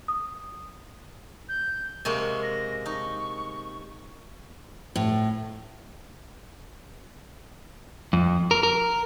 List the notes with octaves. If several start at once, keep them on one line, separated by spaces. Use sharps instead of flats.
D#6
G6
C3 G#3 A#3 C#6
A#6
D#4 C#6
A2
F2
A#4
A#4